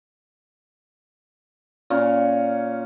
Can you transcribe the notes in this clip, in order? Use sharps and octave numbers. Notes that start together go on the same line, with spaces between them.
A#2 C#4